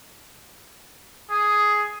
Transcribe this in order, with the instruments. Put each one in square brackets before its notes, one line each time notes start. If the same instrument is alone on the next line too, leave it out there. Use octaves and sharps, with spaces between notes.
[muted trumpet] G#4